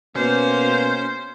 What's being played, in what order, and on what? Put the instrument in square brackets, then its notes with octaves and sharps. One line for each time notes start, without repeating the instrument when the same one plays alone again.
[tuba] B2 [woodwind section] A#3 [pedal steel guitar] C#4 [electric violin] C5